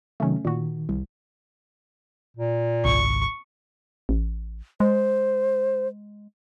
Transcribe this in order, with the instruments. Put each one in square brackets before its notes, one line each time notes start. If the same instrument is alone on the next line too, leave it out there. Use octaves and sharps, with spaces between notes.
[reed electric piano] C3 D#3 F#3 [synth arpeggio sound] A3 C#4
[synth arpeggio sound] A#2 F#4 [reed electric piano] D#3
[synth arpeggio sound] C2
[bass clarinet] A#2
[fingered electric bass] G#1 C#2 [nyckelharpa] C#6
[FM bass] A1
[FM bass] G#3 [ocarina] C5